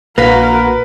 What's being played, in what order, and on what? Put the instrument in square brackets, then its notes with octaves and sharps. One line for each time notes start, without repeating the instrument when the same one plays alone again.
[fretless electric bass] A#1 [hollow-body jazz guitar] A#3 [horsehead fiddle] F#4 A#4 [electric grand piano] B4 B6